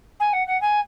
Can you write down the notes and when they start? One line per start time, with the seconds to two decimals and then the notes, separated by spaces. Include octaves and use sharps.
0.19 G#5
0.33 F#5
0.47 F#5
0.61 G#5